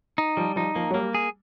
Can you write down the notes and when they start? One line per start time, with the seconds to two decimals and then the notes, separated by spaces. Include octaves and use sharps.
0.18 D#4
0.37 F3 G3
0.56 F3 D#4
0.75 F3 A#3
0.91 F#3
0.94 G3 A#3
1.14 G#4